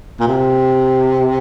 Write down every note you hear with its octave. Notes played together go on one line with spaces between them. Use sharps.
A#2
C3